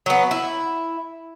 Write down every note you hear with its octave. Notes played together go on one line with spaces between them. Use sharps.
F#3 B3
E4